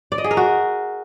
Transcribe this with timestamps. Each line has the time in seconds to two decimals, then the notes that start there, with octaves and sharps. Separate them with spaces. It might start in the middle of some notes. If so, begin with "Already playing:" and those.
0.12 D5
0.18 D#5
0.24 G#4
0.31 A#4
0.37 F#4